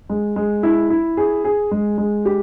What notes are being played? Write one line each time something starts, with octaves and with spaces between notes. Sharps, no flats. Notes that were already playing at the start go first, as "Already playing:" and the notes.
G#3
G#3
E4
E4
G#4
G#4
G#3
G#3
G4